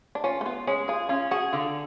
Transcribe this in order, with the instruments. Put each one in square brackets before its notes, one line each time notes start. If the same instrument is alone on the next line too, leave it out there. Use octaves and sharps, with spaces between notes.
[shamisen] D4
[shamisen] C#4 [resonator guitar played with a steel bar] F4
[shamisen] A3
[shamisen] B3 [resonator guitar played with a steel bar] F4
[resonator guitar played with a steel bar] G#3 [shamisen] C#4
[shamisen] F4 [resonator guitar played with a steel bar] G#4
[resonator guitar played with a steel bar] C#4 [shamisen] F4
[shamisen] F#4 [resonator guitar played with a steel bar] G#4
[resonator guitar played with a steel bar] D3 [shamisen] F4